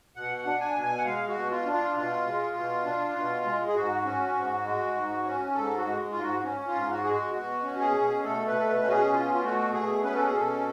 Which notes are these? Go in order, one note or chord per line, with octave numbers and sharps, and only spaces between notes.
B2 F#5
F#5
D4
G#5
B2
G#5
F#5
G#3 F5
F#4
B2
F4
D4
F4
B2 F4
G#3
B2
D4
B2
G#3
G#4
G#2 F#4
C#4
G#2
G#3
G#2
C#4
G#2 A4
F#4
G#3
G#2 F4
F#4
C#4
F4
G#2
F#4
G#3 G#4
F#4
B2 F#4
C#4
G#4
B2
A3 A4
B4
B2 A4
B4
C#4 F#4
G#4
B2 F4
F4
A3 F#4
B2 G#4
C#4 B4
A4
G#4
B2 A4